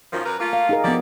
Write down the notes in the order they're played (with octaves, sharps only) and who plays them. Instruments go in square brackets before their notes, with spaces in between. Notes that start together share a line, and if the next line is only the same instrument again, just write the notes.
[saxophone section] F#2 D#3 F3
F#2 A#4 B4
A3 A#3 F4
[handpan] F5
D#4 G#4 A#4
[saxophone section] D3 G4 D5 [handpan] F3 B3